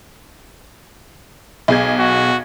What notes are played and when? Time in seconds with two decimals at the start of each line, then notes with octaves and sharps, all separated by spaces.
1.68 B1 G#4 G#6
1.99 F#4